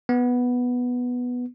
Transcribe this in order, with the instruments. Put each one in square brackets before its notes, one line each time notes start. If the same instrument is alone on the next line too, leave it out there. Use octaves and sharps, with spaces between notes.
[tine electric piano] B3